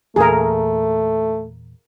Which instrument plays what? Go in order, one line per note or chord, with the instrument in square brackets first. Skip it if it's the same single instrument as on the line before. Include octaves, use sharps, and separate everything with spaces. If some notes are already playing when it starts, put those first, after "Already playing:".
[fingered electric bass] E2 A#2 [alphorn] A3 [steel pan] G#4 A#4